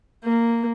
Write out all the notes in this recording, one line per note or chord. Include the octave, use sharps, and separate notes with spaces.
A#3